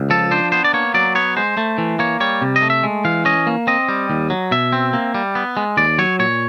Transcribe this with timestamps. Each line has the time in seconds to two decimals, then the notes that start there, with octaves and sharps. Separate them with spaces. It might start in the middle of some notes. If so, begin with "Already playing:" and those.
Already playing: C#2
0.10 F3 A4
0.31 D4 C5
0.52 B3 C5
0.64 D5
0.73 A#3 C#5
0.94 F#3 D5
1.15 B3 C#5
1.36 G#3 C5
1.57 A3
1.78 E3
1.99 A#3 C#5
2.20 G3 C#5
2.42 C3
2.56 D#5
2.62 A3
2.70 E5
2.83 G#3
3.05 E3 F5
3.25 C#4 D#5
3.47 A#3
3.67 C4 D#5
3.89 G3
4.10 D#2
4.30 F#3
4.51 B2 E5
4.72 C4
4.93 A#3
5.15 G3
5.35 B3
5.57 G#3
5.77 D#2 D5
5.98 F#3 C#5
6.19 A#2 C#5